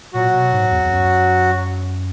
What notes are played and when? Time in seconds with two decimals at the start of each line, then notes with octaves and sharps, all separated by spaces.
0.13 A#2 F#3 F#4
0.33 B2
0.52 G#2
0.71 E2
0.84 E2
0.90 F#2